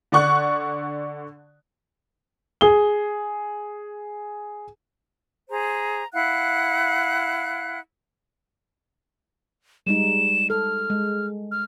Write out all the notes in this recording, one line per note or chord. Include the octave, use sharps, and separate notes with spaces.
D3 D5 F#5 C#6 F#6
G#4 G7
G#4 C5 A#5
E4 F5 F#5 F#6
G3 G#3 D#4 E7
A4 F6
G#3
F6